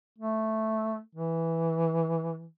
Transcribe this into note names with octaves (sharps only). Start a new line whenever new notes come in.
A3
E3